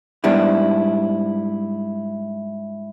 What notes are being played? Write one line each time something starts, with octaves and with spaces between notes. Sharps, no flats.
G#2 G3 B3 D4 E4